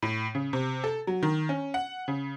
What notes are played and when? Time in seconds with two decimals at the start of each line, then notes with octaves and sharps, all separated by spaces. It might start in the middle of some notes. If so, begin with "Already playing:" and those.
0.02 A2
0.35 C#3
0.53 C3
0.84 A4
1.07 F#3
1.23 D#3
1.49 C#4
1.74 F#5
2.08 C#3